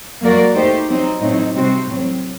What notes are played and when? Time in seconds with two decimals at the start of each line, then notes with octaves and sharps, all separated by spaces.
0.21 F#3 A#3 F#4 A#4 D5
0.54 A3 D#4 G4 C5
0.89 F#3 C4 D#4
1.21 A2 F#3 C4 D#4
1.54 C3 G3 C4 F#4 C5
1.86 A2 F#3 C4